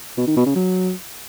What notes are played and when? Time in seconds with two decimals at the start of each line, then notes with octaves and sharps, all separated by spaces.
0.18 B2
0.27 D#3
0.37 B2
0.46 C#3
0.56 F#3